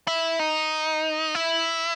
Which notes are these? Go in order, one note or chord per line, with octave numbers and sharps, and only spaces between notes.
E4
D#4
E4